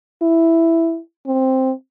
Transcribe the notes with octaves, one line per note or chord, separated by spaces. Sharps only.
E4
C4